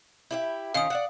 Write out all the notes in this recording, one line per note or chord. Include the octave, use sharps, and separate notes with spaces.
E4 G4 E5
D#3 C#4 F4 F5 D#6
D5 E5 F#5